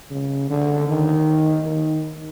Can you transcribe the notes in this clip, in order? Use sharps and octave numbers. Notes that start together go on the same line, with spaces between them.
C#3
D3
D#3
D#3